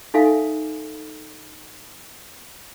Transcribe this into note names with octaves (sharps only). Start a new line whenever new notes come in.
D#4 A4 E5 F5 G#5